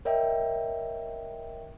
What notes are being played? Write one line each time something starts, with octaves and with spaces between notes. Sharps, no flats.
A#4 C#5 D#5 E5 G5